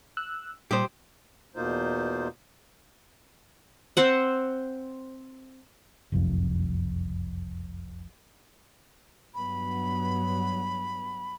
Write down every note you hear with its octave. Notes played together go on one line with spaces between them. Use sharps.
E6 F#6
A#2 G3 G4 C5 D#6
E2 B2 A#3 D#4 F4 C5
C4 C5 F#5
F#1 C2 F2
G2 F#3 B3 B5